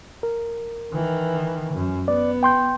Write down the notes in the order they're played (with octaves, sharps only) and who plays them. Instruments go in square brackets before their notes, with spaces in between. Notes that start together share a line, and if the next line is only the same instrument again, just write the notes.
[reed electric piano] A#4
[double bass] D#3 E3
F#2
[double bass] B3 [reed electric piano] D5
[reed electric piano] G5 C6 G6